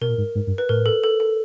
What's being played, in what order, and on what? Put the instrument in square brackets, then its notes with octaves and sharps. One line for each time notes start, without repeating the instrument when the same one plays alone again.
[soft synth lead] B2 [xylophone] A#4
[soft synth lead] A#2
G#2
G#2
G2
[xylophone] B4
[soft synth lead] A2 [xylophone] A#4
[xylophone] A4
A4
A4